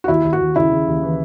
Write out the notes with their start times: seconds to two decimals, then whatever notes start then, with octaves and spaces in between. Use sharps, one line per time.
0.04 F#4
0.08 D#2 E4
0.25 D#2
0.33 F#4
0.40 D#2
0.55 C#3 E4
0.71 C#3
0.88 D#2
1.03 E3